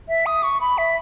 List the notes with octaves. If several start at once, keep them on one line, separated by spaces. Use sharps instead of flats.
E5
D#6
C#6
B5
E5